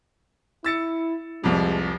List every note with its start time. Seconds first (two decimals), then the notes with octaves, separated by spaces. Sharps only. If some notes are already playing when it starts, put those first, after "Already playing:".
0.64 E4 E6 A6 C#7
1.44 F1 C2 F2 G#3